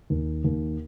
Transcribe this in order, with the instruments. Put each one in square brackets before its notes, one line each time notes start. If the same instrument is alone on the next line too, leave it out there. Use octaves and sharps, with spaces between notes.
[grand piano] D#2
D#2